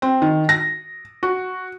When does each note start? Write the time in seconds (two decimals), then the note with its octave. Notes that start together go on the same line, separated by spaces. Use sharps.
0.02 C4
0.22 D#3
0.49 A#6
1.23 F#4